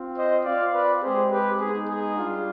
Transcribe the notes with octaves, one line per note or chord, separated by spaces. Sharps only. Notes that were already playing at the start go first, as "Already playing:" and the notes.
Already playing: C4 F4
C5 D#5
C4 F4 D5 F5
B4 D5
G#3 C4 G4 G#4 C5
G4 B4
G#3 B3 D#4 G#4
G#4
G3 D4 F4